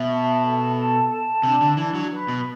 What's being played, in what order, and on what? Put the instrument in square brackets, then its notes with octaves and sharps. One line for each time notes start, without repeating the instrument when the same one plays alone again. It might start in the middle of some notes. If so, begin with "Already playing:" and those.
Already playing: [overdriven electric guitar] B2 [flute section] E5
[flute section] A5
A4
A5
A5
[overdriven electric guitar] C3 [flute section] D4
[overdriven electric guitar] D3
[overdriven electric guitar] E3 [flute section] D4
[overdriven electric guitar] F#3
[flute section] B4
[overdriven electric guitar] B2